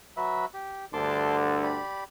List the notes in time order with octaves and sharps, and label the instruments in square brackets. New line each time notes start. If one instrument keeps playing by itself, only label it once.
[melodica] F#3 B4 E5
G4
[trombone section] D2 G2 D3 [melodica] A5 C6 D6
[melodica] G4 D5 B5